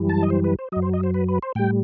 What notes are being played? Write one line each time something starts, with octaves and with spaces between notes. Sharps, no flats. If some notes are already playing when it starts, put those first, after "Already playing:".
Already playing: F#2 E3 G3
A5
D#5
C5
B4
C5
F#2 F#3 D#5
C5
D#5
C5
B4
B4
C5
A2 G3 G5